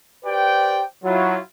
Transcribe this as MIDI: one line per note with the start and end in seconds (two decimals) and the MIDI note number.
0.25 0.81 67
0.25 0.81 71
0.25 0.81 72
0.25 0.81 74
0.25 0.81 79
1.03 1.37 54
1.03 1.37 64
1.03 1.37 65